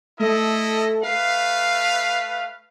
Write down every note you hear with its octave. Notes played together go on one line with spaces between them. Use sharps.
A3 E4 A4 D#5
A3 B4 F5 C7